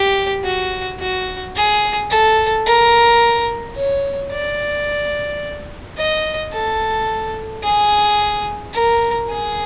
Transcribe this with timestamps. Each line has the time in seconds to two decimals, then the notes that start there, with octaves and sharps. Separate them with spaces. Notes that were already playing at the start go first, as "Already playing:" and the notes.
Already playing: G4
0.45 F#4
1.00 F#4
1.56 G#4
2.10 A4
2.66 A#4
3.76 C#5
4.32 D5
5.98 D#5
6.53 A4
7.63 G#4
8.74 A#4
9.29 G#4